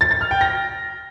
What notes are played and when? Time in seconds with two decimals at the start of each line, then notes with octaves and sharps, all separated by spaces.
0.01 A6
0.11 A6
0.21 F6
0.31 G5
0.41 A#6